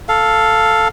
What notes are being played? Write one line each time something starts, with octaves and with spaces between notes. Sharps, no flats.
A4 F5